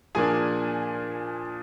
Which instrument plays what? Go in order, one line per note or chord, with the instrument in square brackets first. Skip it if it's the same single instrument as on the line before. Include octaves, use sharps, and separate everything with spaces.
[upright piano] A#2 F3 A#3 D4 G#4 G#5